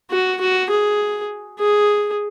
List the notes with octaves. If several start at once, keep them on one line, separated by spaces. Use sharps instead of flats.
F#4
F#4
G#4
G#4